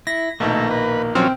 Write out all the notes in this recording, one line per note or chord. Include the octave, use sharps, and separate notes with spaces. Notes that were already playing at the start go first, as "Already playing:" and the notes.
E4 A#6
A#1 B2 D#3 A3 A#3
B4
F3 F#3 C4 C#4 G5 F6